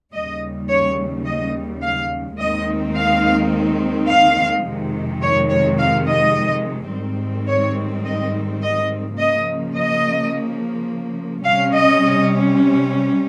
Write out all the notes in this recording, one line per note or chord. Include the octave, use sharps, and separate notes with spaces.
D#2 C#3 G3 D#5
C#5
D#5
F5
D#2 D#3 G#3 C4 D#4 D#5
F5
F5
F2 C3 D#3 G#3
C#5
C#5
F5
D#5
G#2 D#3 G3 C4
C#5
D#5
D#5
C#3 F3 A#3 D#5
D#5
C3 G3 C#4 F5
D#5